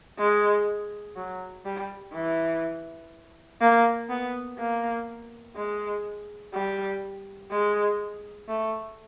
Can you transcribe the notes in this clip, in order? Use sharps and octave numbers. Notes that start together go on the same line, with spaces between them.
G#3
F#3
G3
E3
A#3
B3
A#3
G#3
G3
G#3
A3